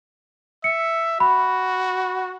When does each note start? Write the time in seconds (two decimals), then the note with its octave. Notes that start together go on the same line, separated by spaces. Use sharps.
0.64 E5 C#7
1.20 F#4 B5